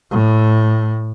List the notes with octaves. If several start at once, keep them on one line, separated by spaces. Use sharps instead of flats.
A2